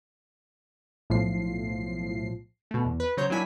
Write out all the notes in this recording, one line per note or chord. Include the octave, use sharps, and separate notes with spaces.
B1 A2 F3 C7
B2 A3
E2
B4
C#3 F#3 C5 C#5 A#5 G6
F#3 A#3 D4 E4 G#5 B6